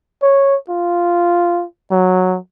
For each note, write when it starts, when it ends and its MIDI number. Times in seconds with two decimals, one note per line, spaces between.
0.23 0.57 73
0.70 1.65 65
1.91 2.38 54